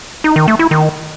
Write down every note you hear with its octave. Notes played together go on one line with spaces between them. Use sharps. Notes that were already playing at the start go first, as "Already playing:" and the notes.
D#4
D#3
A3
E4
D#3